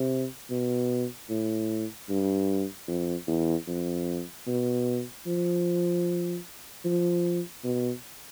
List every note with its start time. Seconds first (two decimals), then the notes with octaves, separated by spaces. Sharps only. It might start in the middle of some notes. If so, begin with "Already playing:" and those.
Already playing: C3
0.50 B2
1.29 A2
2.09 G2
2.88 F2
3.28 E2
3.67 F2
4.47 B2
5.26 F3
6.85 F3
7.64 B2